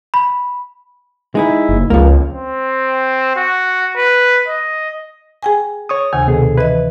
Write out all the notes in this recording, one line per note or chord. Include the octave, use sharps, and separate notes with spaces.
B5
G#3 D#4 E4
F#1
C#2 F3 A#3
C4
F#4
B4
D#5
G#4 G5 G#5
C#5 C#6 D#6
D2 C3 D#3 G#5
B2 G#4 A4
E3 B4 D#5